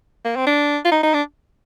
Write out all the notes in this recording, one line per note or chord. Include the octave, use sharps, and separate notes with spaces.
A#3
C4
D4
F4
D#4
D#4
D4